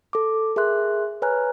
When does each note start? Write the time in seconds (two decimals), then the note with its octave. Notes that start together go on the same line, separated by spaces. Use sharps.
0.13 A4 D6
0.56 G#4 A#4 E5 C6 F#6
1.22 B4 C#5 G#5 A#5 F6 F#6